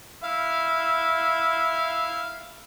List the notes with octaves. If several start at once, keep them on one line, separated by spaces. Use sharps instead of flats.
E4 F5